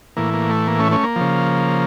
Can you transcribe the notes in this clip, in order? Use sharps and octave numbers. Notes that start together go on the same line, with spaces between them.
A2 E3 A#3
A#3
A3
A#3
A3 C#4
A3 C#4
A#3
C#3 F3